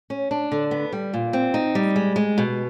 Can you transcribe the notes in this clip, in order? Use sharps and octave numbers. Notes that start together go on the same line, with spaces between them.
C#4
D4
D3
B3
G3
A#2
C4
D#4
G3
G#3
G#3
B2